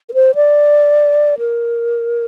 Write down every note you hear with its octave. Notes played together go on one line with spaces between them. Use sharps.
A#4
C5
D5
A#4